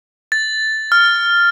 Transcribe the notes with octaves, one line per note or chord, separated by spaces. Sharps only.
A6
F6